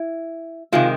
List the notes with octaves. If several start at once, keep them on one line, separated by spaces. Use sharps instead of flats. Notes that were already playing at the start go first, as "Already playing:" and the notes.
Already playing: E4
C3 D#3 G#3 F4